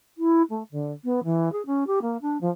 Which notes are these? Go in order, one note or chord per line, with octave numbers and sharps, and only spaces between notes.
E4
A3
D3
B3
E3
G#4
C#4
G4
A#3
D4
F3